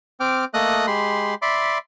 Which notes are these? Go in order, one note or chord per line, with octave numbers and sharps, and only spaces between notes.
C4 G5 D6 F6
A3 A#3 A4 D#5 D#6 F#6
G#3 G4 B5 C6
D5 E5 B5 C6 D6